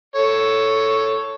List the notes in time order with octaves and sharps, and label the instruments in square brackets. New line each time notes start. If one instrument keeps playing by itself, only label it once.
[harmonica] A4 C#5